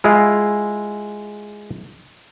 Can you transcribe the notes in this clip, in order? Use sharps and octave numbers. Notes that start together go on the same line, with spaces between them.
G#3 E4 F4